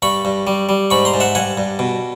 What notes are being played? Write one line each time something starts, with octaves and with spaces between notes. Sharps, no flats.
G2 B5 C#6
G2
G3
G3
G#2 B5 C#6
A#5 C6
G#2
E5 F#5
G2 F#5 G#5
G2
B2